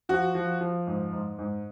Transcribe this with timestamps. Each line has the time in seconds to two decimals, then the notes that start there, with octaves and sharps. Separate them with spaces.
0.09 F3 F#4
0.35 F3
0.61 F3
0.87 G#2
1.13 G#2
1.39 G#2